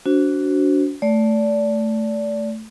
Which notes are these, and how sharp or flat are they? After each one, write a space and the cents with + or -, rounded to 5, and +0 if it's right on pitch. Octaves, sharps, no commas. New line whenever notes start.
D4 -35 F#4 +0 C5 +0
A3 +0 D5 -20